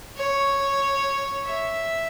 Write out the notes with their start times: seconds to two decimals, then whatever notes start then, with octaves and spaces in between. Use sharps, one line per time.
0.17 C#5
1.45 E5